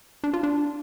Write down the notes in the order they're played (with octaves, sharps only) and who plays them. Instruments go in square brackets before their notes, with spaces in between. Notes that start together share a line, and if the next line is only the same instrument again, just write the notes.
[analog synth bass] D4
F4
D4